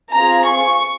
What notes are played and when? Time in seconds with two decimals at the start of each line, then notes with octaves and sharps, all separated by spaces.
0.12 C4 F4 G#4 A#5
0.48 C#6